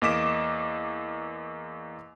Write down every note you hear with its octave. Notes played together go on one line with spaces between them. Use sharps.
E2 A#3 D#5 D6 B6 E7